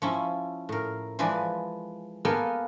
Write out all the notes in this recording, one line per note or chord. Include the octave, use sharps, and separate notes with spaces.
F3 C#4 E4
A2 A#4
E3 F3 G#3 G#4 B4 D5
A#3 B3 A4 A#4 G5 G#5